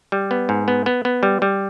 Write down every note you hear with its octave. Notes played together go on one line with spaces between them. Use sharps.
G3
B3
G#2
B3
B3
B3
G3
G3